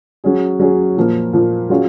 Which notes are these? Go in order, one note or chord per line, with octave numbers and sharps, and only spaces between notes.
F#3 C#4 G#4
F#3 C#4 G#4
A#2 F3 A#3
A#2 F3 A#3
F#3 C#4 F4 G#4